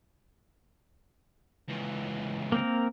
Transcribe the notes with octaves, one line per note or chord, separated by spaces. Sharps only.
C#2 E3
A#3 C4 A#4